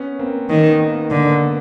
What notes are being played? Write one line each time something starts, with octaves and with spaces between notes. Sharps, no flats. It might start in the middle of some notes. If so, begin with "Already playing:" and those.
Already playing: B3 C#4
A#3 C4
D#3 A#3
B3
A#3
D3 A#3
B3